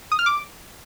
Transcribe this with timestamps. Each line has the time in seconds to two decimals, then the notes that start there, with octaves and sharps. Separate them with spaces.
0.12 D#6
0.19 F6
0.26 D6